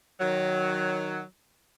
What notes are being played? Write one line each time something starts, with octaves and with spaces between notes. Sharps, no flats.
D#3 F#3